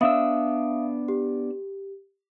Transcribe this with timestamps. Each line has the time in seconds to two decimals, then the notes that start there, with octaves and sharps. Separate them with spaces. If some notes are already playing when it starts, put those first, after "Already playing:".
0.01 B3 D4 E5 F5 D#6 E6
1.08 G4